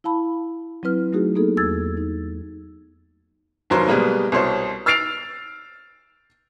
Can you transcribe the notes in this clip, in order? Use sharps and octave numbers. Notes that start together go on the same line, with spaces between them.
E4 F5 A5 B5
F#3 C4 E4 B4 F6
F#3 A3 D#4 F#4 G#4
A#3 B3 D#4 G#4 A4
E2 E6 G#6 A6
D#4
F1 D#2 F#3 A#4 C5
B2 G3 G#3 A#3 B3
C2 B2 C5 C#5
E6 F6 A6 C7 D7 F7